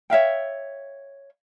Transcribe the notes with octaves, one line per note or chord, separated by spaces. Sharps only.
C#5 E5 F5 G5